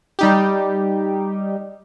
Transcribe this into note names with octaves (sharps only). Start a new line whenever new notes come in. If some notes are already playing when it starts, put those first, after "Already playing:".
G3 D#4 G4